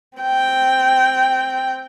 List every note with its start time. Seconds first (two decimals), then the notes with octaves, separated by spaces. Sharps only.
0.18 C4 G5